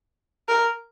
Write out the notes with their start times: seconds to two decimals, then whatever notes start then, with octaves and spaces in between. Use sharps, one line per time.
0.49 A#4